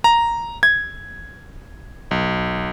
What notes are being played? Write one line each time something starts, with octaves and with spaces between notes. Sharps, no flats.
A#5
G#6
B1